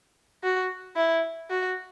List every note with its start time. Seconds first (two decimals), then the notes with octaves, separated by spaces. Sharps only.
0.44 F#4
0.96 E4
1.50 F#4